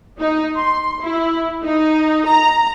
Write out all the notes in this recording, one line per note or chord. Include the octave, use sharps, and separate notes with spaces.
D#4
C6
E4
D#4
A#5